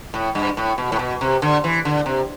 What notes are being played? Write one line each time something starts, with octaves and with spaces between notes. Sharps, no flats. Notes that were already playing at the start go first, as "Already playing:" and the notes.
A2
G2
A2
B2
A2
B2
C3
D3
E3
D3
C3